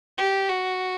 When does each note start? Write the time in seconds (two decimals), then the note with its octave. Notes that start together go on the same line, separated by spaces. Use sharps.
0.18 G4
0.49 F#4